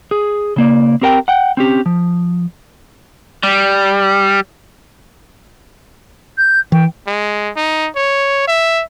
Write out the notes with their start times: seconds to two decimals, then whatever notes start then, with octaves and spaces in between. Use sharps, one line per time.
0.11 G#4
0.56 C#3 A#3 D5
1.02 C4 G4 A#4 F#5 G5
1.28 F#5 G5
1.57 C4 C#4 G4
1.86 F3
3.43 G3
6.38 G6
6.72 E3 G5
7.07 G#3
7.56 D#4
7.96 C#5
8.48 E5